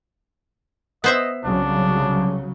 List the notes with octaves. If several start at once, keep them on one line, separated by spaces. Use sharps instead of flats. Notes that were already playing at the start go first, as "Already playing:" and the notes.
B3 C5 D#5 E5
C2 C#3 F#3 D4